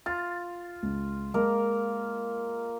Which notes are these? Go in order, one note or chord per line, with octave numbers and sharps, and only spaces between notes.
F4 A6
C#2
G#3 A#3 A#4